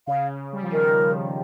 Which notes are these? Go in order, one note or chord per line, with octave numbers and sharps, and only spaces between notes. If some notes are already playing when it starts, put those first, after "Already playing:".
C#3 F5
G3
F3
D#3 A#4